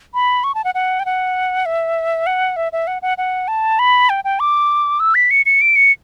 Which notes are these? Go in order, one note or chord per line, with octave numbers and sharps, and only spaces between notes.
B5
C#6
A5
F#5
F#5
G5
F#5
E5
F#5
E5
E5
F#5
F#5
F#5
A5
B5
G5
G5
D6
E6
B6
C#7
C#7
D7
C#7